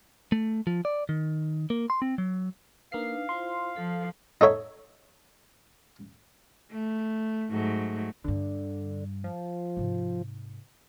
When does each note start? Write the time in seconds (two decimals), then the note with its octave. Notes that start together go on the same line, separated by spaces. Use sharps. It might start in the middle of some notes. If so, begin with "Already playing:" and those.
0.32 A3
0.67 F3
0.85 D5
1.09 D#3
1.70 A#3
1.90 C6
2.02 C4
2.18 F#3
2.92 A#3 D4 D#4 B4 F5 C7
3.29 E4 F4 C5 C6
3.76 F3 A4
4.41 D#4 A4 C#5 E5
6.71 A3
7.51 G#2 F#3 A3
8.24 G2 D3 D4
9.24 F3
9.77 G#2 C3